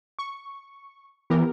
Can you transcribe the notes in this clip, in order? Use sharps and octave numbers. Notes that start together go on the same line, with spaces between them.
C#6
E3 B3 G4 A#4